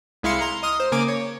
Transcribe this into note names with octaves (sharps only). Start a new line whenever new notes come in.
C2 G#3 E4 F5 C6 C#7
A#5 C6
D#5 C6 D#6 F6
C5
C#3 A#3 G#5 D6
C#5